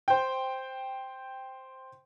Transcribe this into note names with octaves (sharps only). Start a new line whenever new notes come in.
C5 G5